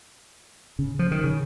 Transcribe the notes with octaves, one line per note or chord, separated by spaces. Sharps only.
C#3
F3
D#3
C#3